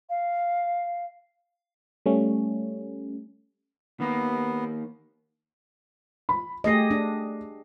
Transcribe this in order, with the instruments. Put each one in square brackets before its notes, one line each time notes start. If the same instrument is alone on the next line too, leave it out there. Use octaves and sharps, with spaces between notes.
[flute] F5
[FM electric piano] G3 A3 C#4
[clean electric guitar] D#3 A#3 [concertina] B3
[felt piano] B5
[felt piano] A3 C7 [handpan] G4 G#4 D#5
[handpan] D4